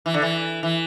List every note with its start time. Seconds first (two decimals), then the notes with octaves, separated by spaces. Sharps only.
0.06 E3
0.14 D3
0.22 E3
0.63 E3